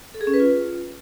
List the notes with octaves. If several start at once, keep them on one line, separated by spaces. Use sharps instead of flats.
A4
G#4
C#4
B4
F4